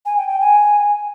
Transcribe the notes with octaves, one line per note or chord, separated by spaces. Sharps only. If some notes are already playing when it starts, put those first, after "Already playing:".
G#5
G5
G5
G#5